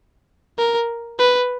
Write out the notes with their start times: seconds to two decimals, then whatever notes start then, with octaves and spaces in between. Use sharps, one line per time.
0.58 A#4
1.19 B4